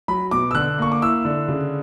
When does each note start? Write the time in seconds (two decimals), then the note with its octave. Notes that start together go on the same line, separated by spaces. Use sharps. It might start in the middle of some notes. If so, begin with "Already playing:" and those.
0.08 F#3 B5
0.31 B2 D6
0.51 E6
0.54 D3 F#6
0.78 A#3 C#6
0.92 D6
1.02 E4 E6
1.25 D3
1.48 C#3